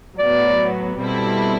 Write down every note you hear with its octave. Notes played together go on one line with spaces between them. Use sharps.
A2 F#3 B3 D5
B2 G3 C4 E4 A4